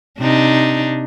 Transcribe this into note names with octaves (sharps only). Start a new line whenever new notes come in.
C3 D4 D#4